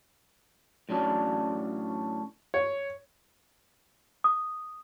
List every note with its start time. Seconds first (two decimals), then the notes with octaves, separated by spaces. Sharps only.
0.89 A2 F#3 C#4 D4
2.54 C#5
4.24 D#6